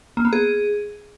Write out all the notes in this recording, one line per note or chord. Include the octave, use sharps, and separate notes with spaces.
A#3
B3
G#4